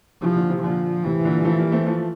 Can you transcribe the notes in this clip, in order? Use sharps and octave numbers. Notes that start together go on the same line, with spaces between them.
C3 E3 F3
A#2 D3
C3 E3
A#2 D3 F3
A2 C3 E3
A#2 D3
G3
F3 A3
G3 A#3
A3 C4
F3 A3